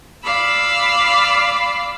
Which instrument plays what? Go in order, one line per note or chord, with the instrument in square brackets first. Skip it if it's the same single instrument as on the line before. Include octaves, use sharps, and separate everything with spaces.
[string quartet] D5 F5 B5 E6